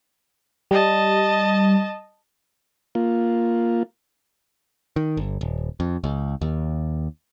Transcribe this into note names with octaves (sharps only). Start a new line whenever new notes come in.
G3 D#5 A5
A#3 F4
D#3
G1
D#1
F2
C#2
D#2